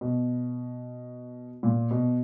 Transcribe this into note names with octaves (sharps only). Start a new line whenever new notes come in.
B2
A#2
B2